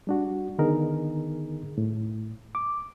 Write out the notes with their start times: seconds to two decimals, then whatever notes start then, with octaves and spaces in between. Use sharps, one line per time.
0.07 G3 D4 F#4
0.59 D3 D#3 B3 D#4 G#4 A#4
1.78 A2
2.55 D6